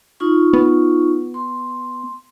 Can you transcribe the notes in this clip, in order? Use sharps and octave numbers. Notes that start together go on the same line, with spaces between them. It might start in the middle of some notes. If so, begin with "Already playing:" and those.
D#4 F4 C#6
B3
C6